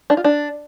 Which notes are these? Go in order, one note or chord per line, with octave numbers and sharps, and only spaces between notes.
D4
F4
D4